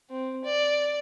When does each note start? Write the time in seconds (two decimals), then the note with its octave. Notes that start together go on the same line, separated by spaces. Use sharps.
0.10 C4
0.45 D5